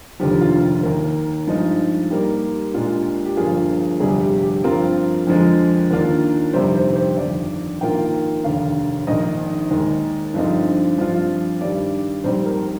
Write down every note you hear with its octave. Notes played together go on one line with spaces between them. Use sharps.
F1 D#2 D3 F3 G4
F4
D#2 D#3 A#3
G2 F3 G#3 D#4
G#2 G3 A#3 G4
A#2 G#3 D4 F4
G4
G1 G2 F3 A#3 F4 G#4
G1 F2 C3 G3 G#4
G4
G4
G2 F3 C4 F4 A#4
F2 D3 F3 G#3
D#2 D#3 A#3 D4 F4
G1 F2 C3 D#3 G3 C5
C5
C5
G1 F2 D#3 D5
A#1 G#2 D#3 A#3 F4 G5
F1 D#2 D3 F5
A#1 G#2 D#3 D#5
D#2 D#3 G#3
G2 D3 F3 C4 D#4
G2 F3 C4 F4
G2 D#3 G3 D5
A#1 G#2 G3 C4 C5
A#4